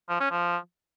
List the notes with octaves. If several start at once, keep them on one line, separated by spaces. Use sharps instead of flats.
F3
C#4
F3